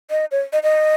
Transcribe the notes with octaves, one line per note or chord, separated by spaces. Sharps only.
D#5
C#5
D#5
D#5